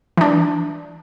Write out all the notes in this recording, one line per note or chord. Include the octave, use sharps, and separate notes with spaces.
E3 D4